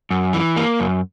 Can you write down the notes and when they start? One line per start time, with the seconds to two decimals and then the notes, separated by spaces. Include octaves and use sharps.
0.11 F#2
0.33 E3
0.57 A#3
0.80 F#2